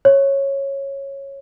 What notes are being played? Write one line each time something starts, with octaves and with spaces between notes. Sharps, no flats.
C#5